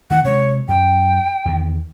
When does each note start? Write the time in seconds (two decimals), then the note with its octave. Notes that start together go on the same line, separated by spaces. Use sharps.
0.11 D#3 E3 A3 F#5
0.25 C3 G#3 C#5
0.68 F#2 G5
1.45 E2 D#3